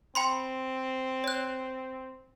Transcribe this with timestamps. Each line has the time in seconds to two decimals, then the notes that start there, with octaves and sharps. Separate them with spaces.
0.15 C4 G5 B5 C6
1.24 C#5 F#6